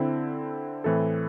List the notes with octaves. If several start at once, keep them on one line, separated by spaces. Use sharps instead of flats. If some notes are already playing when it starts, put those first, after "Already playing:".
Already playing: D3 C4 E4
A2 E3 C4 E4 A4